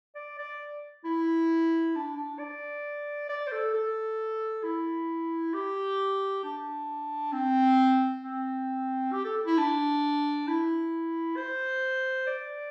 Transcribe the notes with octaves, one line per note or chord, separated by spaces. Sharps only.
D5
D5
E4
D4
D4
D5
D5
C5
A4
A4
E4
G4
D4
C4
C4
G4
A4
E4
D4
E4
C5
D5